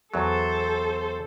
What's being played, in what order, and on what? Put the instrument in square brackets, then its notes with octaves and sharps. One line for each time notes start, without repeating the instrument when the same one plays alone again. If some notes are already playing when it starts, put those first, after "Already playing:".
[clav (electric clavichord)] E2 F#3 [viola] A4 C5